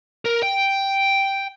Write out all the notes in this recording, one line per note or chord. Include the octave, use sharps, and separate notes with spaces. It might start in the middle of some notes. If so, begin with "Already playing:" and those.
A#4
G5